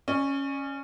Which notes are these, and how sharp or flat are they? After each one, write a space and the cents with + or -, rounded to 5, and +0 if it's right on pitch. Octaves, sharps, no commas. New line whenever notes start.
C#4 -5 D5 +35